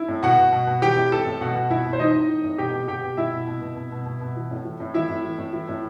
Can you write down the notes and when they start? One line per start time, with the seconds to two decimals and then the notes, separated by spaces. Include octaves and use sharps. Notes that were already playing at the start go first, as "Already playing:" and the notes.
Already playing: E4
0.08 A2
0.23 B2 F#4 F#5
0.38 B2
0.53 B2
0.67 B2
0.82 E3 G4 G5
0.96 A2
1.12 E3 A4 A5
1.26 A2
1.41 B2 F#4 F#5
1.56 B2
1.70 B2 E4 E5
1.85 B2
1.93 C5
1.99 E3 D#4 D#5
2.14 A2
2.29 E3
2.44 A2
2.58 B2 G4 G5
2.74 B2
2.88 B2 G4 G5
3.04 B2
3.17 B2 E4 E5
3.33 B2
3.47 B2
3.61 B2
3.77 B2
3.92 B2
4.06 B2
4.21 B2
4.36 E3
4.51 A2
4.65 E3
4.80 A2
4.94 E3 E4 E5
5.10 A2
5.25 E3
5.38 A2
5.53 E3
5.69 A2